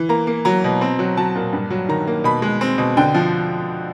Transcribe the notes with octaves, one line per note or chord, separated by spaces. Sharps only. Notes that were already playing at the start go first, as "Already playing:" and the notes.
Already playing: E3
A#3 A#5
A#3
F#3 A#5
B2
C4
F#3
F#3 A5
A#2
G2
F#3
D#3 A#5
A#3
B2 B5
G#3
C4
B2
D3 G5
F3